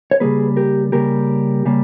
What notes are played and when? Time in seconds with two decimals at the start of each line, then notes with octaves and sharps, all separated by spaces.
0.11 C#5
0.20 C#3 G3 A#3 G#4 B4
0.56 G4 A#4
0.92 C#3 G3 A#3 G4 A#4
1.65 C#3 G3 A#3